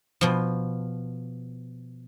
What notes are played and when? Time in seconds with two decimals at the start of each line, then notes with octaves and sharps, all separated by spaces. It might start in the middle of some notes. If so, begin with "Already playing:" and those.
0.21 B2 F3